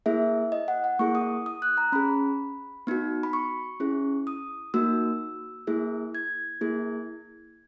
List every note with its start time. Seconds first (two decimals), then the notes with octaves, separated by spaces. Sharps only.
0.06 A#3 E4 G#4 E5
0.52 D#5
0.68 F#5
0.84 F#5
0.99 A#3 E4 G#4 C#6
1.15 D#6
1.46 D#6
1.62 F#6
1.77 A#5
1.92 C#4 G#4 B5
2.87 B3 D#4 F#4
3.23 B5
3.33 C#6
3.80 C#4 E4 G#4
4.27 D#6
4.74 A#3 D#4 F#4 E6
5.67 A#3 E4 G#4
6.15 G#6
6.61 A#3 E4 G#4